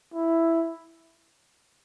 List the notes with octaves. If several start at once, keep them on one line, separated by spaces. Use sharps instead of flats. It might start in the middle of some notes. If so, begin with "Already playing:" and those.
E4